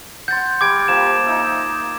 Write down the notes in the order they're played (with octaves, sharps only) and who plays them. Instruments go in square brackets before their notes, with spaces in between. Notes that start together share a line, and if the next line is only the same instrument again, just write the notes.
[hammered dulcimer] F#5 C6 [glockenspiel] G6 A6
[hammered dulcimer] G3 [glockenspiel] D6 G#6 D7
[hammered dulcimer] F3 A#3 [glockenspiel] E7
[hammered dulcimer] D#4 E5